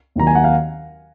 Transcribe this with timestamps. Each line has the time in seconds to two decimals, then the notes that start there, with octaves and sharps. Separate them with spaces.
0.16 D#2 D#3 F#3 A#5
0.27 G#5
0.35 F#5
0.44 F5